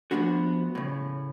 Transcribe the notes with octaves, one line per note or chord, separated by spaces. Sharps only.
F3 G3 A3 B3 D4 F#4
A2 C#3